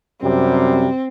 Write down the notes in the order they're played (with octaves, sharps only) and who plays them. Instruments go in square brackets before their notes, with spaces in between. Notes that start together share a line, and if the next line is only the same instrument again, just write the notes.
[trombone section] F#2 C3 G3 [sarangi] C4